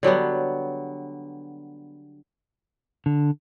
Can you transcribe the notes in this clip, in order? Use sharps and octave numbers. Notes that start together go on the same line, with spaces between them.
D3 F#3 G3 B3
D3